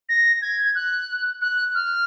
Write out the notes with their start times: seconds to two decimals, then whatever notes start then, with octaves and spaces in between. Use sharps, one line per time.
0.09 A#6
0.42 G#6
0.75 F#6
1.42 F#6
1.75 F6